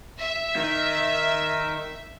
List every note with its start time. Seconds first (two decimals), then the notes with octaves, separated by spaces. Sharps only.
0.19 E5
0.56 D#3 D#4